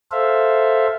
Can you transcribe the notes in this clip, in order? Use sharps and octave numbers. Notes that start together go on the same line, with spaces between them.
A4 C5 E5 F5